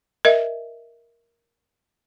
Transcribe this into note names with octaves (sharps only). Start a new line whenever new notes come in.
A#4 D#5 E5